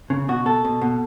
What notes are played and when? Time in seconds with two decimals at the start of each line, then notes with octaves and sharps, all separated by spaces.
0.10 C#3
0.28 B2 F#4
0.46 B2 A4
0.65 B2
0.81 B2